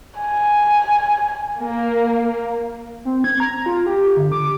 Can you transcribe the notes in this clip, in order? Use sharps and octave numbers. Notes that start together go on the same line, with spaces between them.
G#5
A#3
C4
G#6
A#5
F4
G4
D3
D6